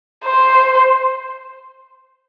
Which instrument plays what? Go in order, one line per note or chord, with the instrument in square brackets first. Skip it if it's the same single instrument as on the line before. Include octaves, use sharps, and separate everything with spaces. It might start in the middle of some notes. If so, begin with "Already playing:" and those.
[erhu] C5